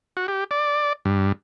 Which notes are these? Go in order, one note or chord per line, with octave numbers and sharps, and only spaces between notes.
F#4
G4
D5
G2